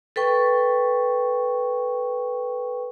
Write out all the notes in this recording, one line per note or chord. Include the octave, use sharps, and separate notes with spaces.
A4 B4 G5 C#6